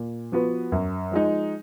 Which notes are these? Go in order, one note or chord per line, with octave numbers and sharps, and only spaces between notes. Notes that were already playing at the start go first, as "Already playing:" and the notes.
Already playing: A#2
F3 B3 F#4 B4
F#2
F3 G#3 D#4